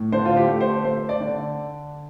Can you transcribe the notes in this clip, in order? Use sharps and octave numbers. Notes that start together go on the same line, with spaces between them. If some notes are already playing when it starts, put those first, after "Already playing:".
Already playing: A2
D3 C5
F4
G4
A3
C5
A3 C5
D5
D3